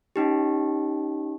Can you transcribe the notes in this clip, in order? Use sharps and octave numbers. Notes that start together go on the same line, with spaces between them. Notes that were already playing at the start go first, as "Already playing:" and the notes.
C#4 D#4 G4